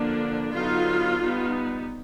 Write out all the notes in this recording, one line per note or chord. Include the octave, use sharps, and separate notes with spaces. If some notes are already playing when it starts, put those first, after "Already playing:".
Already playing: D3 F3 A#3 D4
D3 F#3 B3 D#4 F4
G3 B3 D#4